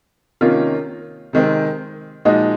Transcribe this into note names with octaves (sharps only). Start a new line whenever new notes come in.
C3 D#3 A#3 C#4 F4
C3 D#3 G#3 C4
A#2 F3 G#3 D#4 F#4